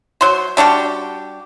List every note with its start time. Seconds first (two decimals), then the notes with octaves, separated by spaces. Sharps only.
0.21 F#3 C5
0.57 G3 D4 F#4 G4